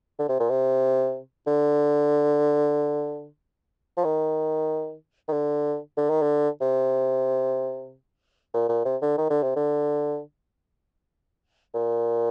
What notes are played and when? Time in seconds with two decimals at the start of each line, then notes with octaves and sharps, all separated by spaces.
0.19 D3
0.29 C3
0.40 A#2
0.50 C3
1.47 D3
3.97 F3
4.04 D#3
5.28 D#3
5.32 D3
5.97 D3
6.10 D#3
6.22 D3
6.61 C3
8.54 A#2
8.69 A#2
8.85 C3
9.02 D3
9.18 D#3
9.30 D3
9.43 C3
9.56 D3
11.74 A#2